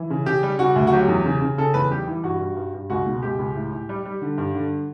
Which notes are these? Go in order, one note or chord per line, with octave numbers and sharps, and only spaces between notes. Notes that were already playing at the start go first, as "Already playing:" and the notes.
Already playing: E3
C#3
C#3 G4
G3
C#3 F#4
D2
F#4
F#3 G4
E2
C#3
C#3
C#3 A4
E2 B4
G3 G4
E3
G2 F#4
G2
G2
G2
C#2 F#4
B2
C#2 G4
C#2
A2
A2
G3
G3
D3
G2
D3